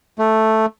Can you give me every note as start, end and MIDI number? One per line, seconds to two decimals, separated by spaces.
0.19 0.66 57